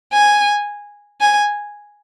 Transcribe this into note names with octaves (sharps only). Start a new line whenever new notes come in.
G#5
G#5